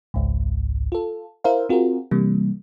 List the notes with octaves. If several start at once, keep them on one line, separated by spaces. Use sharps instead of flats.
G#1 C#2 G#2
F4 A4
E4 A#4 C5 E5 F5
C4 F4 F#4 G#4 A#4
C3 E3 G3 A#3